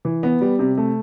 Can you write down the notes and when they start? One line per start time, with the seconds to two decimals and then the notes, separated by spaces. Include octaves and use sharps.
0.05 E3
0.23 B3
0.41 G3
0.59 C3
0.77 A3